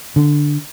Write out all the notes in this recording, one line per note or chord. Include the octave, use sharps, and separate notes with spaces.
D3